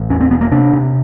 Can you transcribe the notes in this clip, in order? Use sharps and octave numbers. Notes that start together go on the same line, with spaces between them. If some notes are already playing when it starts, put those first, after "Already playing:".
Already playing: A1
E2 C#4
C4
E1 B3
A#3
C3 D4
C3